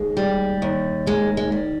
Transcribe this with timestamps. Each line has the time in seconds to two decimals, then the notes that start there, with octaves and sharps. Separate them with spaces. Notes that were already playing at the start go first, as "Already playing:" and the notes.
Already playing: D#2 G#3
0.17 G3
0.62 D#2
1.07 D#3 G#3
1.37 G#3
1.52 G3